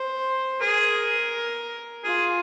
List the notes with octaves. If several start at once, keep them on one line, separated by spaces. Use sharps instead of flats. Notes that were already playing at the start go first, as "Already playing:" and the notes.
Already playing: C5
G#4 A#4
F4 G#4